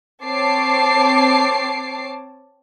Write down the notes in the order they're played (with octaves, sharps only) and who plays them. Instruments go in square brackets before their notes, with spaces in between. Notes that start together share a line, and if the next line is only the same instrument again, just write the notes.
[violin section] C4 C#5 A5 D6 C7